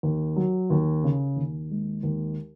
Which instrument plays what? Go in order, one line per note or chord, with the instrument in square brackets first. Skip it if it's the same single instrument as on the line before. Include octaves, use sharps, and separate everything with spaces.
[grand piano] D#2
F#3
D#2
C#3
D#2
G#3
D#2